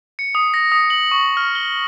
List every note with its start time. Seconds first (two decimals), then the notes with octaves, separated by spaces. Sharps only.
0.19 C#7
0.35 D#6
0.54 A#6
0.72 D#6
0.90 F#7
1.11 C#6
1.37 F6
1.55 G7